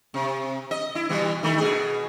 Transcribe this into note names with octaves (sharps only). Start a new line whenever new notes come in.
C3
D#5
E4
B2 E3 G3
D#3 A3
B2 G#4